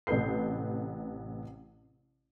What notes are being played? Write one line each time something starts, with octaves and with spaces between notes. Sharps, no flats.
A1 C3 A4 B4 G6 C7